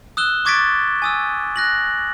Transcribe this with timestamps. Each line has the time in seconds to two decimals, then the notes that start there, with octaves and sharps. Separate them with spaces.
0.17 D#6 E6 F#6 E7 G7
0.45 C#6 D6 G#6 A6 B6 D7
1.02 G#5 D#6 E6
1.56 F#6 A#6 F#7